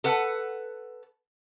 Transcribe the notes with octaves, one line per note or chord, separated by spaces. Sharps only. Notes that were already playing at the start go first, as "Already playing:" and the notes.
A4 B4 F#5